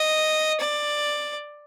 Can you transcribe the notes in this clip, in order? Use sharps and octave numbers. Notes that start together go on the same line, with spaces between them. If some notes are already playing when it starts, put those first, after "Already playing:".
Already playing: D#5
D5